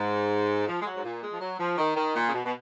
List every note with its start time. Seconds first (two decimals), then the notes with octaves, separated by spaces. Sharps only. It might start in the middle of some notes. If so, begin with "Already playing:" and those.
Already playing: G#2
0.67 F3
0.81 G#3
0.85 F#3
0.96 G#2
1.04 A#2
1.22 G#3
1.32 F3
1.40 F#3
1.59 F3
1.78 D#3
1.96 D#3
2.15 A#2
2.27 C#3
2.34 B2
2.45 B2